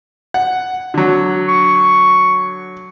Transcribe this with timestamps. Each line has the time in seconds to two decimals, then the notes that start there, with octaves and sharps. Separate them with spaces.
0.34 F#5
0.94 D3 F#3
1.48 C#6